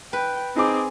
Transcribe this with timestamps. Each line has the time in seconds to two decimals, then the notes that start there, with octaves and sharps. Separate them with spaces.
0.13 B4 G5
0.56 C4 D#4 G#4 G#5 D6